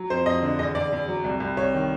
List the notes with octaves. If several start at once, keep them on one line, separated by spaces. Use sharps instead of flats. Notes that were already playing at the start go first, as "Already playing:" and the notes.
Already playing: F#3
F2 C5
F2 D#5
D3
E2 D#5
E2 D5
E2
F#3
C2
C2
C2 C#5
D#3